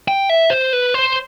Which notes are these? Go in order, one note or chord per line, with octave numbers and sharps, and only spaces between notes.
G5
E5
C5
B4
C5